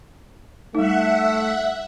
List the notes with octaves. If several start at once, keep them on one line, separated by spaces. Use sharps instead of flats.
G3 A3 D#4 E5 F#5